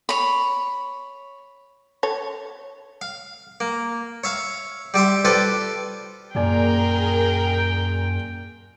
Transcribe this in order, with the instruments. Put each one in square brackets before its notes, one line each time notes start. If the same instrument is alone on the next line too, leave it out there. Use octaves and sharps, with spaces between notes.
[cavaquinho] C#5 B5
[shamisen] A4 C#5
[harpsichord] F5
A#3
C#5 E5 F5
G3 G4 E5 C6
F4 G4 A4 B4 C5 D5
[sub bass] F#2 [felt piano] A#2 D5 G#5 [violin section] G#4 A#4 [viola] G5